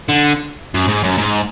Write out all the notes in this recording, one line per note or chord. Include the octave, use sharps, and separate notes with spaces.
D3
F#2
G#2
F#2
G#2